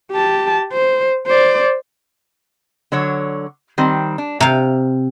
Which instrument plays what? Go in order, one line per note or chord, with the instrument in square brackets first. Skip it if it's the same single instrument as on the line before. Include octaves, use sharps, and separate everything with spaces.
[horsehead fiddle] G4 A5
C5
C5 D5
[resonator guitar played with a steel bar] D3 F#3 C#5
D#3 G3 C4
D4
[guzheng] C3 F5 [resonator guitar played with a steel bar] A#5